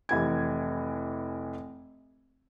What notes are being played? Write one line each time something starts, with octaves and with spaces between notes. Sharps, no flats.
F1 E3 G#6